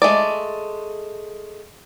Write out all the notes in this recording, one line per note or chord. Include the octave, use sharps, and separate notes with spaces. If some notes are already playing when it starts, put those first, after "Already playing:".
G#3 A3 D5